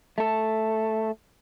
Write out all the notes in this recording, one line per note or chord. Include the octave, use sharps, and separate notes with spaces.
A3 A4